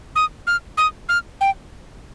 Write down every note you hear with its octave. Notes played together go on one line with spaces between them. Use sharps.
D#6
F6
D#6
F6
G5